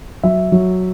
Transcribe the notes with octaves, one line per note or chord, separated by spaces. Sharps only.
F#3 E5
F#3